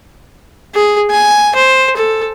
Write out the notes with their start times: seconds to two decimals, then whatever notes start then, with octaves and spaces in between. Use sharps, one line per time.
0.75 G#4
1.11 G#5
1.55 C5
1.96 A4